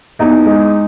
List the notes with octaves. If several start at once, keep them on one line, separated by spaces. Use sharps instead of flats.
E2 D#4
G#3